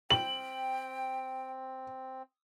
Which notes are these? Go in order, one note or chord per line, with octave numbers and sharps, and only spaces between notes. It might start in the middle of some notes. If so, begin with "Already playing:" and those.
C4 G5 F#7